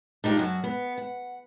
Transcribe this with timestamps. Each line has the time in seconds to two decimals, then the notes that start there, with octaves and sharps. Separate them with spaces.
0.24 D4 D#4 F4 G4
0.37 F#2 F#3 F#4
0.64 B3
0.98 F#5